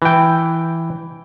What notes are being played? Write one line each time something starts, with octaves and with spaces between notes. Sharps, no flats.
E3 G5